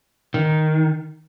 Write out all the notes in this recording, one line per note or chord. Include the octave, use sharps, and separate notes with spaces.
D#3